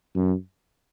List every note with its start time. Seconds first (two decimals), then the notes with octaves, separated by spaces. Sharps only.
0.15 F#2